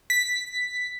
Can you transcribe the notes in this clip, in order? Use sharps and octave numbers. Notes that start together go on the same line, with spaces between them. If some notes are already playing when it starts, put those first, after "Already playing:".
B6